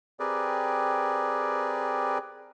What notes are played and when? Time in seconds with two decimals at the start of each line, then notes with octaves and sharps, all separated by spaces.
0.20 C4 G4 G#4 A#4 B4 D5